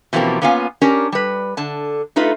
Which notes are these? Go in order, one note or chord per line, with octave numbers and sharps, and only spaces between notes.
B2 E3 F3 A#3 C4 G4
A#3 B3 C#4 F4 F5 G#5
C#4 D4 G4 A#4
G3 B4
D3 A5
A3 D#4 F4 B4